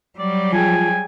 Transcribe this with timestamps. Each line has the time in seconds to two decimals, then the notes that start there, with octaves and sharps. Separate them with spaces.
0.19 F#3 G3 D5
0.53 F3 G#4 G5 G#5